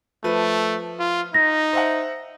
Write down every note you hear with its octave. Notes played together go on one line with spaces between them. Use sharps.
F3 A3 B4
F4
D#4 A#6
C5 E5 F#5